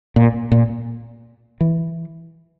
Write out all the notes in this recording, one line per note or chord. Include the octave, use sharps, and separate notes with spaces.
A#2
A#2
E3